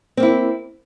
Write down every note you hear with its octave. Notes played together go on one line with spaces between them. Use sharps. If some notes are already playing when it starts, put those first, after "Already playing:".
A#3 C4 E4